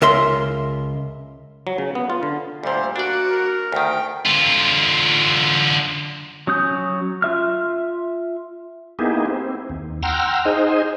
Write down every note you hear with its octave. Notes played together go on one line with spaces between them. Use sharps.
C#2 A#4 E5 C6
F#3
C#3
B3
F4
D3
D2 A#2 G3 C5
A#3 D4 F#4 D5
A#4
D2 D#3 G5
D3 F4
F#3 C#4 D#6 G6
F4 E5 F6
A#3 B3 D#4 E4 G4 G#4
C4
D#2
F#5 G5 A#5 C6 E6 F6
D#4 G#4 C5 D#5